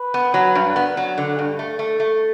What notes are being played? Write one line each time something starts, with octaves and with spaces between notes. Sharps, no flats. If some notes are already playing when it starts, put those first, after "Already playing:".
Already playing: B4
B3
F#3
G2
B3
F#3
D3
G2
A3
A3
A3